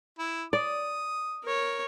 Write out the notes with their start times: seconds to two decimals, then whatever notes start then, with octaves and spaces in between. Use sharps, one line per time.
0.19 E4
0.53 D5 D#6
1.44 A#4 C#5